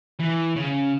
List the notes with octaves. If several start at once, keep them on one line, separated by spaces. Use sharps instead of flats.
E3
C#3